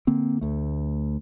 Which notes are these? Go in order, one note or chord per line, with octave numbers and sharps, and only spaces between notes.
D3 A#3 C4
D2 A3